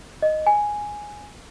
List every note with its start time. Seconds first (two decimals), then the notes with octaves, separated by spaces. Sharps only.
0.22 D#5
0.47 G#5